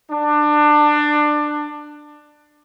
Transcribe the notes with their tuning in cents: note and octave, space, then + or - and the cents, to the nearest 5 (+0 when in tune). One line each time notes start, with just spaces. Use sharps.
D4 +20